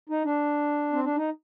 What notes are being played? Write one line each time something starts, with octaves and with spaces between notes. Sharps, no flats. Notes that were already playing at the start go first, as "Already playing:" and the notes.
D#4
D4
C4
D4
D#4